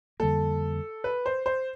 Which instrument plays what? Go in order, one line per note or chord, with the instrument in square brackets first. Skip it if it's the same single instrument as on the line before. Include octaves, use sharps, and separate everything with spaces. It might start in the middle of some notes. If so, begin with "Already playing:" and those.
[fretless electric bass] F2 D3 G3 A#3 [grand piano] A4
[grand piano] B4
C5
C5